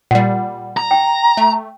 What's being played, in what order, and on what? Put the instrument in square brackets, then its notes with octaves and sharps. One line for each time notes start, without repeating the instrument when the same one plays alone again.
[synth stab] A#2 G3 [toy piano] F#5
[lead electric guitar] A#5
[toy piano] G5
[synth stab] A3